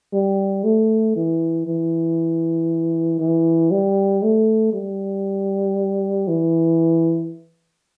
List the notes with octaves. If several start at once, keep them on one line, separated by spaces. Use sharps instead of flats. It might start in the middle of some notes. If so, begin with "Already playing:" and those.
G3
A3
E3
E3
E3
G3
A3
G3
E3